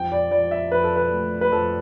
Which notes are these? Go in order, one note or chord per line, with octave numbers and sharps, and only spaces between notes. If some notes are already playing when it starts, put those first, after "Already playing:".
Already playing: F2 G5
D5
F2 D5
E5
F2 B4
A4
B4
A3
B4
F2 A4